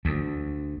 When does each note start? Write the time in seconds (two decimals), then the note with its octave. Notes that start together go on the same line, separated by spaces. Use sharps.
0.05 D2